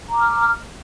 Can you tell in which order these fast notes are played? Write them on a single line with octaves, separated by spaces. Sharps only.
A#5 D6 F6